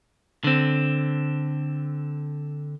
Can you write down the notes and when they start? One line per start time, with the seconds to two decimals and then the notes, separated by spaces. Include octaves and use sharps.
0.44 D3 C4